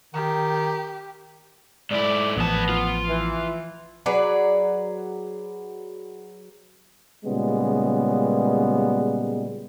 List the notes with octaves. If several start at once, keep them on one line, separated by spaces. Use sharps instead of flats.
D#3 G4
G#2 E4 D5
A1 A#2 F3 B3 A5
F4
E3
F#3 G#4 B4 D5
A#2 C#3 G3 G#3 B3